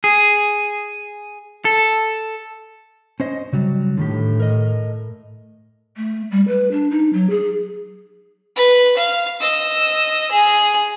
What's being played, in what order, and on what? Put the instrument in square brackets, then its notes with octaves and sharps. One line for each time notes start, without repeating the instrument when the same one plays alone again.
[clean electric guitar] G#4
A4
[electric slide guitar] C#4 C5 D#5
C#3 F#3 G3
[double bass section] A2 [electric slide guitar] D3 D#3 G4
[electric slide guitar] A#4 D#5
[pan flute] A3
G3
B4
D4
D#4
F#3
G#4
[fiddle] B4
F5
D#5 E6
G#4